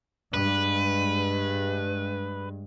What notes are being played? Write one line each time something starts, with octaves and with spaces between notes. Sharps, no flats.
G2 G#3 B4